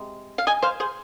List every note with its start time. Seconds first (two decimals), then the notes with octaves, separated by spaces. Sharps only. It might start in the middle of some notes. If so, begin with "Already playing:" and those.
Already playing: C3 G#3
0.38 F5
0.47 D#5 G#5
0.62 C5 F5
0.80 G#4 C5